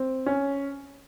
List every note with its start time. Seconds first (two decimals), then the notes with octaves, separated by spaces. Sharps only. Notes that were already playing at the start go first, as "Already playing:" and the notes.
Already playing: C4
0.26 C#4